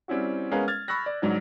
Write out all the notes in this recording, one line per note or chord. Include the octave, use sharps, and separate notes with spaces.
G3 C4 C#4 E4 F#4
G#3 B3 C#4 A#4 B4 F5
F6 G#6 A6
B5 C#6 E6 F#6 A#6
D5
C#2 G#2 F#3 D4